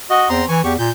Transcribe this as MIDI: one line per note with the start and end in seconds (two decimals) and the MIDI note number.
0.10 0.28 66
0.10 0.28 75
0.29 0.43 40
0.29 0.45 60
0.29 0.45 82
0.29 0.45 84
0.48 0.60 52
0.48 0.61 80
0.48 0.61 85
0.64 0.74 40
0.64 0.73 67
0.64 0.73 85
0.79 0.90 46
0.79 0.91 91